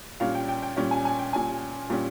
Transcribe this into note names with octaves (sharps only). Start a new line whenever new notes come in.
A#2 G3 C#4 F5
G5
G5
G5
A#2 G3 C#4 G5
G#5
G#5
G5
A#2 G3 C#4 G#5
A#2 G3 C#4